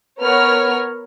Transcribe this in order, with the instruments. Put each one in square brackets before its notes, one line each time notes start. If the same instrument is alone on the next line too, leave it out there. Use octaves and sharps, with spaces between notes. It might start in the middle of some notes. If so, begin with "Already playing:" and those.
[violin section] B3 A#4 C#5 F6